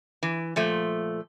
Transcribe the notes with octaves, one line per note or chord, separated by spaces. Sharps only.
E3
A#2 F3 A3